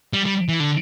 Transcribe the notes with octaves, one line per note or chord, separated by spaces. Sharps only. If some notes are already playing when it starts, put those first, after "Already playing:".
G3
G3
E3
D3